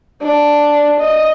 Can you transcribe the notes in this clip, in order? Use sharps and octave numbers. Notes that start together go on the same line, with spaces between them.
D4
D#5